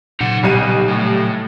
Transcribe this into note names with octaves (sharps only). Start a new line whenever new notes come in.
A#2 C#3 F#3 D#4 F#5
B1 B2 G3 D#7
A2